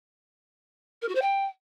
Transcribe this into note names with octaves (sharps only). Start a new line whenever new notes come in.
A#4
F#4
C5
G5